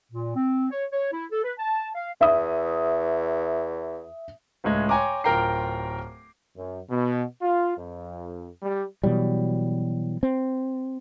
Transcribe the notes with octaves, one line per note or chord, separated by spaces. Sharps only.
A#2
C4
C#5
C#5
E4
A4
B4
A5
F5
E2 E5 D#6
C#2 A2 G#3 G#6
C#5 G5 G#5 A#5 C6 D6
D1 F4 A#4 G5 A#5 C7
F#2
B2
F4
F2
G3
B2 E3 F#3 G3
C4